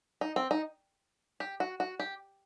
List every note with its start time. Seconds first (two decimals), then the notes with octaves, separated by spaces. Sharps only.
0.21 D#4
0.36 C4
0.51 D#4
1.40 G4
1.60 F#4
1.80 F#4
2.00 G4